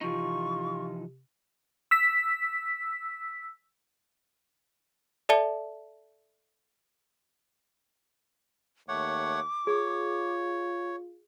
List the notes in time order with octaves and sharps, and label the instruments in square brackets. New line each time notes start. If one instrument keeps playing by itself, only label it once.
[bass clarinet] C3 [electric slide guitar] E3 F3 D#4 [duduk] F4 [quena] C#6
[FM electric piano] E6 B6
[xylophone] A4 D5 E5 A5 C#7 G7
[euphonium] D#2 [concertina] A3 C#5 F#5 [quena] D6
[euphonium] F4 [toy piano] G#4 [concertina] C#5